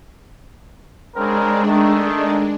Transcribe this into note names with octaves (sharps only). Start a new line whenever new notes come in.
C#3 G#3 C4 D4 A#4
D#3 A3